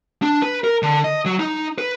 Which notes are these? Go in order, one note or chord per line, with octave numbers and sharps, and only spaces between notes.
D4
B4
A#4
D3
D#5
F#3
D#4
B4